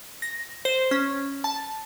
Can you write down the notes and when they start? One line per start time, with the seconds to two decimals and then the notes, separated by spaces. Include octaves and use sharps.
0.22 A#6
0.65 C5
0.91 C#4
1.44 A5